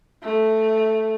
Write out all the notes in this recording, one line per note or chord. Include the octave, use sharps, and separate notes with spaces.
A3